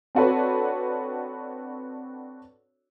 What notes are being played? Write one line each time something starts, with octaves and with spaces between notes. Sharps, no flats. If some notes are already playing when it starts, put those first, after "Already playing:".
C4 D4 F#4 A4 B4 C#5